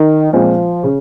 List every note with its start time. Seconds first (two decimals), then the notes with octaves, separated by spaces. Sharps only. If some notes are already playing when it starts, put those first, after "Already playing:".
Already playing: D#3
0.33 A#2 F3 G#3 C4
0.84 C#3